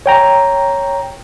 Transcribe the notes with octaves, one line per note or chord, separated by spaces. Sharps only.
C#5 G5 A#5